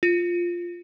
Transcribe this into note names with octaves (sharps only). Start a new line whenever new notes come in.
F4